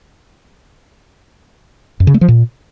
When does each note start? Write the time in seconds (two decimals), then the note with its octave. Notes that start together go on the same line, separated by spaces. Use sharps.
2.00 F#2
2.07 C#3
2.14 A3
2.21 F3
2.28 A#2